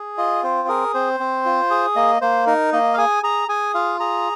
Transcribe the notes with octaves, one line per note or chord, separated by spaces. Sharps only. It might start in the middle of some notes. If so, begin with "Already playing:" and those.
Already playing: G#4
F4 D#5
C4 C5
G#4 A#4
C4 C5
C4
F4
G#4
A#3 D#5
A#3 C5
D#4 A#4
A#3 D#5
F5
G#4 G#5
G#4 A#5
G#4 G#5
F4 F5
G#4 A#5